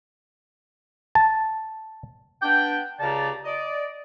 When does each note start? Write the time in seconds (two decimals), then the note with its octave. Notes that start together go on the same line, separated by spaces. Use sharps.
1.15 A5
2.42 B3 D4 B4 G5
3.00 C#2 C#3 G4 D5 A5 A#5
3.45 D5 D#5